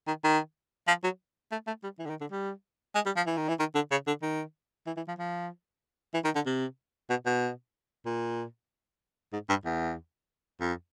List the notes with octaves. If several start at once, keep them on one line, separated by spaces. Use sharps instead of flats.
D#3
D#3
F3
F#3
A3
A3
G3
E3
D3
D#3
D3
G3
G#3
G3
F3
E3
D#3
E3
D#3
D3
C#3
D3
D#3
E3
E3
F3
F3
E3
D#3
D3
C3
B2
B2
A#2
G#2
G2
E2
F2